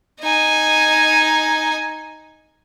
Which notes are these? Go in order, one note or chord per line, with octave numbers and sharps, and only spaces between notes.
D#4 G#5